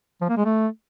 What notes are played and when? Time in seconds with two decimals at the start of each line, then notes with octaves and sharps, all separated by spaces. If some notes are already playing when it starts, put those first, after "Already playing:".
0.21 F3
0.29 A#3
0.37 G#3
0.45 A3